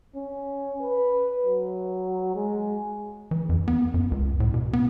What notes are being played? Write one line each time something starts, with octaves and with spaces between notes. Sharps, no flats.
C#4
B4
F#3
G#3
E3
F2
B3
F#2
C#2
A2
B2
B3